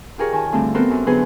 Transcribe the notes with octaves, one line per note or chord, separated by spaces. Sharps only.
F4 G4 G#4 A#4 C#5
D#3 G#5 A5
D3 F3 G3 A3 C4
B3 C4 F#4 A4 A#4 C5
F#2
D3 F#3 B3 G#4 B4 C5